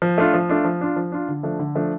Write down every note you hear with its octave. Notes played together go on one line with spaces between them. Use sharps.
F3
A3 D4 F4
F3
A3 D4 F4
F3
D4 F4
F3
D4 F4
D3
F3 A3 D4
D3
F3 A3 D4